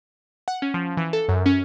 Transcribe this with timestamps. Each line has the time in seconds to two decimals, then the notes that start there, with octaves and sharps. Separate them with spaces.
0.48 F#5
0.62 C#4
0.74 F3
0.97 E3
1.13 A4
1.28 F#2
1.46 C#4